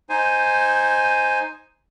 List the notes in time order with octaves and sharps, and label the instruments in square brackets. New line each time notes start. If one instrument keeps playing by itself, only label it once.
[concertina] D#4 C5 G#5